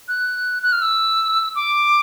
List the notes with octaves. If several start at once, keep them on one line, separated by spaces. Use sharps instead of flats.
F#6
F#6
F6
E6
D6